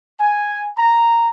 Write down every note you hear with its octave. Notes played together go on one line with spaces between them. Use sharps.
G#5
A#5